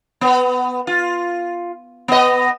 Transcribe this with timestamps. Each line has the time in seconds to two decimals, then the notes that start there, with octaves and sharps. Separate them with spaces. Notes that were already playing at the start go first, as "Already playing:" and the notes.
0.21 B3
0.87 F4
2.08 B3 D#5